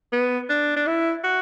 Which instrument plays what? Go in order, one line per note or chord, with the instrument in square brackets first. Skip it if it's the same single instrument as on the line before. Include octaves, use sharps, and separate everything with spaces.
[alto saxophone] B3
D4
D4
E4
F#4